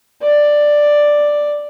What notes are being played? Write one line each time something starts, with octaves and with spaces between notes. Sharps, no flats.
D5